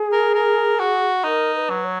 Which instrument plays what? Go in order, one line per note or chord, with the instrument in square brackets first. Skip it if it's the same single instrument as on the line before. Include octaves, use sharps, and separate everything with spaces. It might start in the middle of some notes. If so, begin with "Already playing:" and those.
Already playing: [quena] G#4
[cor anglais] A#4
A#4
F#4
[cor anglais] D#4 [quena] A#4
[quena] B4
[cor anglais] F#3
[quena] C#5